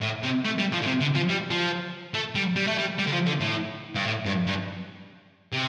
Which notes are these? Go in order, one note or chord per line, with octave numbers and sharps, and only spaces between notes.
A2
C3
A3
G3
F3
A2
C3
D3
F3
G3
F3
A3
G3
G3
A3
G3
G3
D3
F3
D3
A2
G2
A2
G2
G2
C3